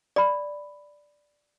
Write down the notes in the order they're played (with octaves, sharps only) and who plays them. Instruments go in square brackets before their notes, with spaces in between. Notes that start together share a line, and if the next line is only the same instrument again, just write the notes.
[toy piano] D5 B5